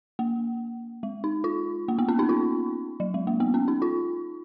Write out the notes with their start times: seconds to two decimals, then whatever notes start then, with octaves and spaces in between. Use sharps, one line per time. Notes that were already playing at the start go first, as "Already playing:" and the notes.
0.19 A#3
1.03 G#3
1.24 D#4
1.44 F4
1.88 A#3
1.99 B3
2.08 C#4
2.19 D#4
2.29 F4
3.00 F#3
3.14 G#3
3.27 A#3
3.40 B3
3.54 C#4
3.68 D#4
3.82 F4